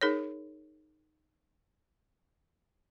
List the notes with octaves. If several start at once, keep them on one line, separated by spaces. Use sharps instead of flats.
D#4 G#4 A#4 C#5